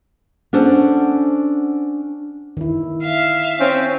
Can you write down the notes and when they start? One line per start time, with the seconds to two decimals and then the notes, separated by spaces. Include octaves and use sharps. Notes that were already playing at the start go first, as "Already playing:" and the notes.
0.53 C#4 D4 A4 C5 F#5
2.57 D#3 E4
3.03 E5 F5
3.60 C4 C#4